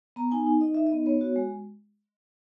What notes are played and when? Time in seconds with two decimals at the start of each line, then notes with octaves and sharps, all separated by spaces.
0.16 B3 A#5
0.31 D#4 G#5
0.47 D#4
0.61 D#4 D#5
0.75 D#4 E5
0.86 D#5
0.92 B3
1.06 B3 C#5
1.21 F#4
1.36 G#3